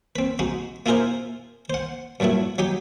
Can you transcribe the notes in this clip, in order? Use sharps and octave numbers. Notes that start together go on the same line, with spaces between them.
C4 B4
G#3 D#4 F#4
A#3 E4 F4 G#4 A#4 C5
C5 F#5
G2 A#2 F#3 A3 E4
F#3 D#4 G4